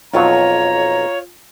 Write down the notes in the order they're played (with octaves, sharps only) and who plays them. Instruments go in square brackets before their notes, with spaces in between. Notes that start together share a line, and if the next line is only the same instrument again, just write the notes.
[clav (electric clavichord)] B1 F2 F#3 [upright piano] F4 [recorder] C#5 [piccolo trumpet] A#5